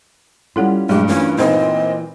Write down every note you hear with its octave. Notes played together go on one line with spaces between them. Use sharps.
G3 C#4 E4 F4 A4 F#5
G2 A#2 F#3 G#3 A3 G4
E3 A#3 C#4 F4
A#2 C4 D#4 B4 C5 D#5